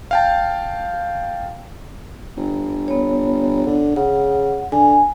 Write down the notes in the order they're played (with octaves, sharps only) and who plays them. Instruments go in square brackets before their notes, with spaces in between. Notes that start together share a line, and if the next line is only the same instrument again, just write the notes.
[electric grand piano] F5 G5 A5
[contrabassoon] G1
[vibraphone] B3 C#5
[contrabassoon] D3
[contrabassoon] C#3 [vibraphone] F#5
[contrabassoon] D3 [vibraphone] G#5